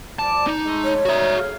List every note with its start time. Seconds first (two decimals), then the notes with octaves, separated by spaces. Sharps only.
0.19 F3 G3 D5 A5
0.47 D#4
0.64 G#3 A3
0.84 C#5
1.05 F#2 G3 D#4 F#4 E5
1.37 A3 G#4 F5